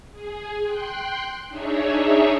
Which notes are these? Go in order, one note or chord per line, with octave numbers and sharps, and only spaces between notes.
G#4
G5 C6 F#6
D4 D#4 G#4 C#5 E5